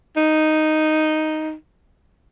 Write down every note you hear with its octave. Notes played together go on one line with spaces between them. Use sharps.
D#4